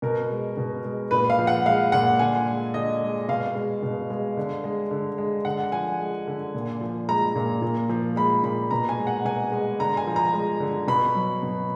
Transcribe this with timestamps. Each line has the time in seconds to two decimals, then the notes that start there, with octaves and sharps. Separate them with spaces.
0.02 B2 A#4
0.30 G#3
0.57 B2
0.84 G#3
1.11 A#2 B4
1.30 F5
1.39 F3
1.47 F#5
1.66 G#3 F5
1.92 A#2 F#5
2.19 D3 G#5
2.48 G#3
2.74 D3 D#5
3.01 G#3
3.28 B2 F5
3.55 G#3
3.82 B2
4.10 G#3
4.37 D3
4.64 G#3
4.91 D3
5.18 G#3
5.45 D3 F#5
5.72 F3 G#5
6.00 G#3
6.27 D3
6.55 A#2
6.81 F3
7.09 G#3 A#5
7.35 A#2
7.62 A#2
7.89 F3
8.16 G#3 B5
8.43 A#2 B5
8.71 B2 A#5
8.89 G#5
8.98 G#3
9.07 F#5
9.25 B2 G#5
9.52 G#3
9.79 D3 A#5
9.97 G#5
10.07 F3
10.16 A#5
10.34 G#3
10.60 D3
10.88 B2 B5
11.15 F#3
11.43 B2